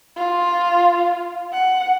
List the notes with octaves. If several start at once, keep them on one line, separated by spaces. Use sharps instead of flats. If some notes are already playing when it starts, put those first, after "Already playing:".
F4
F#5